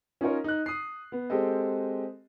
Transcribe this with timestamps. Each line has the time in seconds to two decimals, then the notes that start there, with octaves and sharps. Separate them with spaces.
0.21 C#4 D#4 F4 A#4 C#5
0.44 D#4 F#6
0.66 D#6 C7
1.12 B3
1.30 G#3 C4 G4 A4 D#5